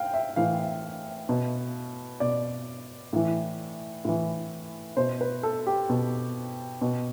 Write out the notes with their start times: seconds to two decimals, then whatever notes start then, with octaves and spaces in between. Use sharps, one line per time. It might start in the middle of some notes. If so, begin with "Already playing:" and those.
Already playing: F5 G5
0.14 E5
0.36 A2 E3 F5
1.29 B2
2.20 B2 D5
3.13 A2 E3
4.05 A2 E3
4.97 B2 C5
5.21 B4
5.43 A4
5.67 G4
5.89 B2
6.81 B2